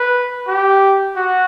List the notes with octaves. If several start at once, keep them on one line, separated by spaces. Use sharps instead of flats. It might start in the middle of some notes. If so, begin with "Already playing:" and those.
Already playing: B4
G4
F#4